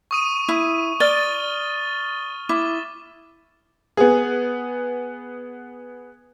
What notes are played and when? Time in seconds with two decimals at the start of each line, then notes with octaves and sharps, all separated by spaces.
0.11 C#6 D#6 D#7
0.49 E4
1.00 D5 F6 A6 G7
2.49 E4 D6
3.97 B3 G#4